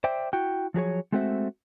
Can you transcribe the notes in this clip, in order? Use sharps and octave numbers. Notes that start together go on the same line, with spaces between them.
C5 D5 E5 G5
E4 F#4 G5
F3 F#3 G#4 C#5
G#3 A3 C4 F#4 C5 E5